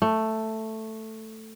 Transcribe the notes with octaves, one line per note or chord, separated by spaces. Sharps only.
A3